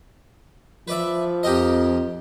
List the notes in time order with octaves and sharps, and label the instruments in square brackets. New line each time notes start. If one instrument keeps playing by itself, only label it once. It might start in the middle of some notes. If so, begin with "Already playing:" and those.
[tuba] F3 [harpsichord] B4 D5 E5
[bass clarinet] F2 [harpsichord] G4 A#4 D#5